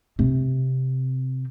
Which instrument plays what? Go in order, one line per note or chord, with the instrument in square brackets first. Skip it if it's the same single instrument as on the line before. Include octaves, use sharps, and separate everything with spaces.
[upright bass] C3 C4